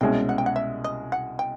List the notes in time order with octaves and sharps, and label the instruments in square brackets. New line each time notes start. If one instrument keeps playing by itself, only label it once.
[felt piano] C2 B2 G#3 C#4 [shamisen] G5
[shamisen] F#5
G5
F#5
E5
D#5
F#5
G5